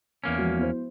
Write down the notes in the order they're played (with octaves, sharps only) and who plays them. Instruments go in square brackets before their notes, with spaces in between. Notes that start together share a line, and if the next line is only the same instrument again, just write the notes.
[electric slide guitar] E2 A#3 C#4
[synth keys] F3 G#3 F#4
B3 E4 C5